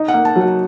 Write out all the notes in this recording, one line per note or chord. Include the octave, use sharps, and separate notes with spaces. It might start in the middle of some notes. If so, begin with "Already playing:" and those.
Already playing: D#4 D#5
F#5
A#3
A5
F#3
F#5